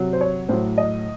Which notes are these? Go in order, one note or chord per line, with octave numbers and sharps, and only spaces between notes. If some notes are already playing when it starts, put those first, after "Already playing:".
Already playing: C3 F#3
C5
C#5
A2 F#3 C5
D#5